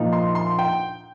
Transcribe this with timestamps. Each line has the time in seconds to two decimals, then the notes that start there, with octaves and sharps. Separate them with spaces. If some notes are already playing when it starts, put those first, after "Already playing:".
Already playing: A#2 F3 D#4
0.13 C6
0.35 C6
0.59 G5